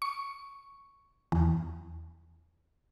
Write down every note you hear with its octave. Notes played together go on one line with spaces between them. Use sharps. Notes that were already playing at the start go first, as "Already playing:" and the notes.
C#6
E2